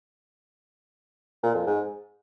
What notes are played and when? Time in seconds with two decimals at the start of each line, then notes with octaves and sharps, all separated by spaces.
1.43 A#2
1.55 F2
1.66 G#2